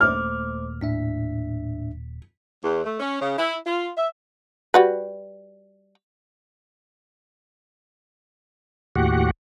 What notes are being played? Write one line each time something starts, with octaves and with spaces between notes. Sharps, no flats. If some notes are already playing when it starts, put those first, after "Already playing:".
D#1 E2 A3 A#3 C5 D6 F6
A2 D4 E5 B6
E2
A3
C#4
C#3
E4
F4
E5
G3 F#4 B4
D#2 A2 F#4 G4 F#5